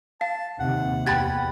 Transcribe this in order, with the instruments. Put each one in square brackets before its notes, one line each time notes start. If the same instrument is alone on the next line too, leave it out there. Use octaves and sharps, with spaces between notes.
[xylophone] F5 [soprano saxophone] A5
[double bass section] D#2 C3 [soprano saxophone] F#5
[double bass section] E2 [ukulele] G4 G5 B5 [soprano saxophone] F#5 [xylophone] G#6 A6